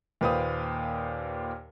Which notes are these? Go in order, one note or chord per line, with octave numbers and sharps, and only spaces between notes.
D#2 A#2 B4 C5 F5 D#6